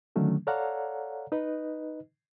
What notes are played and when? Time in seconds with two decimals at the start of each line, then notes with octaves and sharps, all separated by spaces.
0.16 D3 D#3 F#3 A3 C#4
0.47 A4 C#5 D5 F5 F#5 A#5
1.32 D#4 B4 D#5